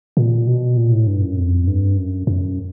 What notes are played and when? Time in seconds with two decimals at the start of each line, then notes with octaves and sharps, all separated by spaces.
0.17 A#2
0.47 B2
0.77 A#2
0.92 A2
1.07 G2
1.22 F#2
1.37 F2
1.67 G2
1.97 F#2
2.27 F#2